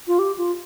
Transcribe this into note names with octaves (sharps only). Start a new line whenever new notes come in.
F4
G4
F4